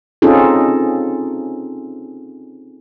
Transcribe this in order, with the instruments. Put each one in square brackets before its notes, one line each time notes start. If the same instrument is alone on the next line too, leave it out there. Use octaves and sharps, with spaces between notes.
[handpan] C4 C#4 D#4 F4 G#4 A4